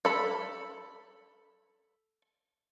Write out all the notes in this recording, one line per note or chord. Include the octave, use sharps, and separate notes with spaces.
A4 B5